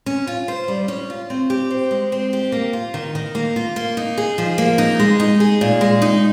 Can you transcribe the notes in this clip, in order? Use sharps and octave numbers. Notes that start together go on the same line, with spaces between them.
C#4
F4
C5
G3
C#4
F4
C4
G4
C5
G#3
C4
G4
A#3
F4
D#3
D#3
A#3
F4
A#3
D#4
G#4
F3
A#3
D#4
G#3
D#4
G#4
A#2
G#3
D#4